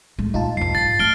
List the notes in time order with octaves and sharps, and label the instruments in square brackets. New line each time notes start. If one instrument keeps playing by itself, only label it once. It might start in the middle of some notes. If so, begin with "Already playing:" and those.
[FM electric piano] A2 [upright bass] G#3
[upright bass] A#2 [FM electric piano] D#4 F4 A5
[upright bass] F1 B3 [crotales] C7
[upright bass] G#1 [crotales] A6 C7
[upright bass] A3 [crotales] F6 D7 G7